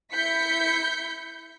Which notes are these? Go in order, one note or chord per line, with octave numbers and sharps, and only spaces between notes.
E4 G6 B6 C#7